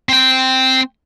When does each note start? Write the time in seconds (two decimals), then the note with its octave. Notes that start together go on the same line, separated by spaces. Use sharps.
0.09 C4 G5